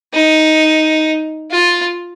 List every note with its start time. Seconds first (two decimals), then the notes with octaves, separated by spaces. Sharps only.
0.14 D#4
1.51 F4